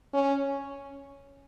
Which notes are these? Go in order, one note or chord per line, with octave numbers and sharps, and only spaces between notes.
C#4